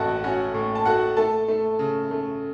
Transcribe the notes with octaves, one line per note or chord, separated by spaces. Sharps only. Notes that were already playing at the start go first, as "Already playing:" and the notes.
Already playing: A1 A2 F#4 F#5 A5
C#4 F#4 F#5
A2
A5
A3 F#4 F#5
A3 A4 A5
A3
C#3
A3